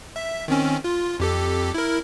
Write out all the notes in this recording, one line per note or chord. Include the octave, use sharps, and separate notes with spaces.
E5
D#3 C4 C#4
F4
F2 G4 A4
E4 A#4